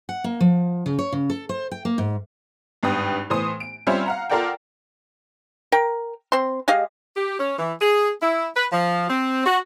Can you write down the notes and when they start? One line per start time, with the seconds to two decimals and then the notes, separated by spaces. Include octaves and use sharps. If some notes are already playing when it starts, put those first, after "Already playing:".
0.09 F#5
0.24 A#3
0.40 F3
0.86 C#3
0.99 C#5
1.12 C#3
1.30 A4
1.49 C5
1.71 G5
1.85 A#3
1.98 G#2
2.83 G#1 G2 B4 G5 D#6
3.30 A2 E3 C5 D#6
3.60 D7
3.87 G3 C4 C#4 F4 C5 E5
4.06 F5 F#5 A#5
4.30 F4 A4 A#4 D5 F#5 G5
5.72 A#4 G5
6.32 C4 C6
6.68 G#3 G4 D#5 F5
7.16 G4
7.39 C#4
7.59 E3
7.81 G#4
8.22 E4
8.56 B4
8.72 F3
9.09 C4
9.46 F#4